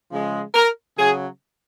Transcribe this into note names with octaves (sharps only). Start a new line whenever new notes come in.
C#3 F3 G#3
A#4
C#3 F#3 G#4